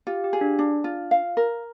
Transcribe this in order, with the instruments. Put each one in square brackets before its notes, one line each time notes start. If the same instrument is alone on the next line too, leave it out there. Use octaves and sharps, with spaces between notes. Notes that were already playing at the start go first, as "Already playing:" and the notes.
[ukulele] F4 [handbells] G4
[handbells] G4
[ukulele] G#4
[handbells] D4
[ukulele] D4
F4
F5
A#4